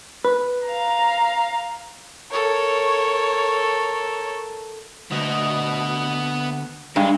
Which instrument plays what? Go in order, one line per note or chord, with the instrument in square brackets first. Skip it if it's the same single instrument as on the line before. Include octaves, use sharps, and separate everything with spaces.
[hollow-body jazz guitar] B4
[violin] F5 A#5
[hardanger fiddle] A4 A#4 [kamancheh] C#5
[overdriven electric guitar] D2 [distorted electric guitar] B3 D#5
[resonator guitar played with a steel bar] G2 [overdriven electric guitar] G#3 G#4